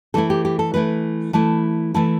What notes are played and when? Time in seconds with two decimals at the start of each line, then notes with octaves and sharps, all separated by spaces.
0.14 E3 A3 E4 A4
0.30 G4
0.45 G4
0.59 A4
0.74 E3 A3 E4 B4
1.33 E3 A3 E4 A5
1.94 E3 A3 E4 A5